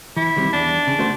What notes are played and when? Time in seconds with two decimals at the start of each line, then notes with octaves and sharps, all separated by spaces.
0.17 E3 E4
0.36 D#3 G3 C4
0.53 E2 D4
0.87 C#3
0.99 A3 F#4 C5